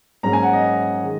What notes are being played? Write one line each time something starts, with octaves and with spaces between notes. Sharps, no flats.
G#2 F#3 A#3 C#4 A#5
G#5
F#5
D#5
D#3 G#3